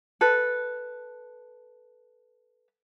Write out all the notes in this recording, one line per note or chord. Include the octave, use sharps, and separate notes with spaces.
A4 B4